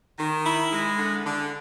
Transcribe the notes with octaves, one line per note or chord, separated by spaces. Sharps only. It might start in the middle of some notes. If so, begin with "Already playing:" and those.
D#3
E4
G#3
D3
D3